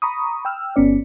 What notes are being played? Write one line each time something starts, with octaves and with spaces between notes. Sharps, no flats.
A#5 B5 C#6 D#6
G5 E6 F6
G1 B3 C#4 D5